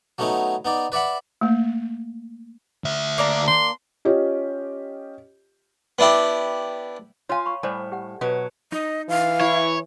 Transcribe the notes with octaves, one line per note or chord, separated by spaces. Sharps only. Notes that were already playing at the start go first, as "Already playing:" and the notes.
F#3 A3 B3 C#4 D#4
B3 D#4 D5
B4 D5 E5 F#5 B5
A3 A#3
D2 E5
A#3 D4 A#5
C6
C#4 F4 G4 D#5
B3 D4 E4 G4
F4 C#5 F5 G#5
B5 C#6
A2 G3 C5 G#5 A5
G4 F#5
B2 F#3 B4 C#5
D#4 D#5
E3 F5
E4 C#5